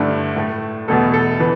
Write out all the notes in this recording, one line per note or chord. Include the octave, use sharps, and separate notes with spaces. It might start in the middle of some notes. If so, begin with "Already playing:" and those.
Already playing: G2 D3 A3 E4
A2 A3
E2 B2 A3 A4
A4
E3 B4